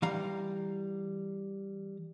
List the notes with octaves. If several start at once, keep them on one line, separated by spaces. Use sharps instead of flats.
E3 G3 F5 A#5